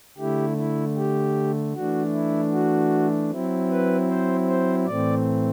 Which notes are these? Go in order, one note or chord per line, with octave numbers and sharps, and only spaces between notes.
D3 A3 E4 G4
E4
G4
E3 A3 D4 F#4
E4
F#4
F#3 C4 E4
B4
C5
C5
A2 E3 A3 C4 D5